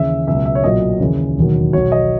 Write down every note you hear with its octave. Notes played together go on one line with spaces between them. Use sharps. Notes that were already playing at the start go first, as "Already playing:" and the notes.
Already playing: D#2 C#3 E3 E5
C#2 B2 F#3 E5
E5
C#5
B1 A#2 F#3 D#5
D#2 C#3 E3
E1 D#2 D#3 F#3
B1 B2 F#3 C#5
D#5